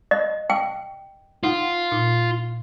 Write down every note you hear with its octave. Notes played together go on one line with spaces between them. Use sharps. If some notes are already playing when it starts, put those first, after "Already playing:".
D#5
G5
D#4 F4 F#5
A#2 D#4